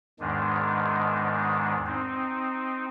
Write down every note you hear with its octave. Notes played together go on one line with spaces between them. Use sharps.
E2 G#2 D#3 G#3 D4
C4 D#4